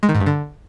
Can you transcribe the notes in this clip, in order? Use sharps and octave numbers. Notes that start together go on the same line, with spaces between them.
G#3
D#3
G#2
G2
D3